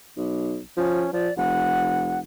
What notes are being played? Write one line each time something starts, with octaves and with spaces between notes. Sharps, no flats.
B1
F3 C#4
F3 D5
F1 F#5